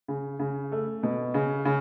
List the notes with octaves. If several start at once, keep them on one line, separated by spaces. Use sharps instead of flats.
C#3
C#3
A3
B2
C#3
C#3